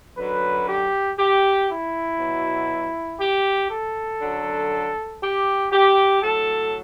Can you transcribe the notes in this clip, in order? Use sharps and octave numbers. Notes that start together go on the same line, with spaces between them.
F#2 D3 F#3 B4
G4
G4
E4
B2 F#3
G4
A4
F#2 D3 F#3
G4
G4
A2 F#3 A4